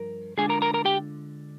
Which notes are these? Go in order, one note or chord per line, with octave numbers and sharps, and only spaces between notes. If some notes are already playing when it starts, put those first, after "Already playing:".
Already playing: G2 F3 A#4
D3 G#3 D4 F4 G#4 G#5
A#4 A#5
A#4 A#5
A#4 A#5
G4 G5